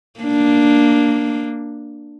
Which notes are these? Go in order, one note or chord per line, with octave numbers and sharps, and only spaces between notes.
A#3 D4